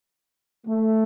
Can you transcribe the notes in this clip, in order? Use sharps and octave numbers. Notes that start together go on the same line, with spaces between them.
A3